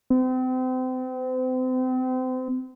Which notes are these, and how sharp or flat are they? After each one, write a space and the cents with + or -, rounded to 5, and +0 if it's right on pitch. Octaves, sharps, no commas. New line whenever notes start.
C4 -35